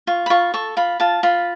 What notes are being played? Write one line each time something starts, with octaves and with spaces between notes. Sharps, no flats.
F4 C#6
B5
F4 C#6
A4 C#6
F4 B5
F4 A5
F4 B5